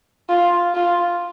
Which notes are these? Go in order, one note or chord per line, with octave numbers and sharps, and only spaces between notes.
F4
F4